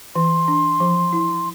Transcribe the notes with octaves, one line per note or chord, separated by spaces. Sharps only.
E3 C6
D4
F3
E4